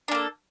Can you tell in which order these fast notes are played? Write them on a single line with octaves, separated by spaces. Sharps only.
D4 A#3 A4